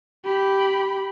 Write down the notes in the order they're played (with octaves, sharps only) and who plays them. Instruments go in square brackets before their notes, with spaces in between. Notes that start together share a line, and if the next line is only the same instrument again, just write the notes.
[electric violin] G4 B5